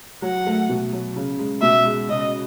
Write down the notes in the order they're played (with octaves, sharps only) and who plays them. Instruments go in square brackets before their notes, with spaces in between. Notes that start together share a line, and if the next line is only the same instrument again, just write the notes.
[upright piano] F#3 [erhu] F#5
[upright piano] A3
B2
F#3
C#3
G#3
[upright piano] B2 [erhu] E5
[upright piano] G#3
[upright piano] C#3 [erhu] D#5